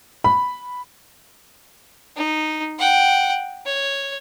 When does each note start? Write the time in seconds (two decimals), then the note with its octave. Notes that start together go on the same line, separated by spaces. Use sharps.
0.24 B5
2.16 D#4
2.78 F#5 G5
3.66 C#5